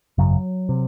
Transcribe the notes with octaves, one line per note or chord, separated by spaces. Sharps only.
G#1 F#2 C#3 F#3
C3